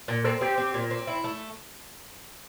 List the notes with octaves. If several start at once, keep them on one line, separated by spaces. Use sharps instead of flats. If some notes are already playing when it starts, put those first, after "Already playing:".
A#2
C4 A4
C4 G4
C4
A#2
C4
E4
A3